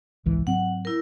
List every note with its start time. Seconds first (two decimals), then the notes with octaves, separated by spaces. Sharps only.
0.26 G#1 C#2 E3
0.47 G#2 F#3 C4 F#5
0.85 E4 A#4